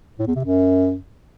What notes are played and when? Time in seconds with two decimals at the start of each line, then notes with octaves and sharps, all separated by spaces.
0.19 A2
0.27 E2
0.36 C3
0.44 F#2